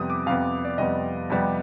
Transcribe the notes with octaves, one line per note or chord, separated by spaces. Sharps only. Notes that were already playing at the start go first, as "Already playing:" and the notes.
Already playing: F2 C3 G3 B3 D#6
D6
F2 C3 G3 B3 F5
D5
F2 C3 G3 B3 D#5
F2 C3 G3 B3